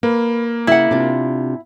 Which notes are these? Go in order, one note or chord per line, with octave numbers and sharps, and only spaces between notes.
A#3 B4
C#3 E4 F#5
C3 D4 F4